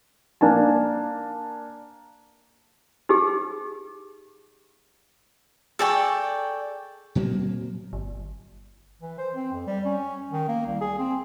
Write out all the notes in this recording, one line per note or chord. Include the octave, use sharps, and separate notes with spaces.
A#3 D4 G#5 A5
D#4 G4 G#4
G#4 A4 D5 G5 G#5 C#6
A#2 F#3 A#3 C4
G1
E3
C5
C4
F2
G3
C#4
D#3
A#3
C2
G#4
C4